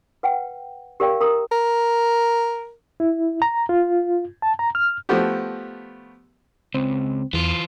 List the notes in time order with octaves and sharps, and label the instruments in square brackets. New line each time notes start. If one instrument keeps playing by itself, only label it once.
[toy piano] B4 F#5 G5
G4 A#4 D5 F5 G5
A#4 A#5 D#6
[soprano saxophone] A#4
[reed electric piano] E4
A#5
F4
A5
A#5
F6
[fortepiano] F3 A3 B3 F#4 G4
[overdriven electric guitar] C#2 [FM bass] C4
[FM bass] E2 [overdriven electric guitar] E3 F4